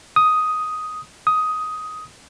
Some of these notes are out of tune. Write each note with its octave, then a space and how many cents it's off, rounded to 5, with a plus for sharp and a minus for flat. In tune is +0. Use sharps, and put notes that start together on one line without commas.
D#6 +5
D#6 +10